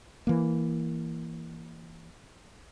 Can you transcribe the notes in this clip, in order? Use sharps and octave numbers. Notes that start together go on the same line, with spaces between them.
E3 A#3